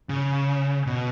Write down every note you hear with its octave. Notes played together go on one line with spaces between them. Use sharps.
C#3
B2